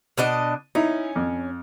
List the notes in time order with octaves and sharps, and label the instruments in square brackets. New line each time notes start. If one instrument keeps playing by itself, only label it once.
[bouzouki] B2 D4 D#5
[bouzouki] C#4 [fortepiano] D#4 E4
[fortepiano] F2